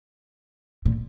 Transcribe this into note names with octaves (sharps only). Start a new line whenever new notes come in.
A#2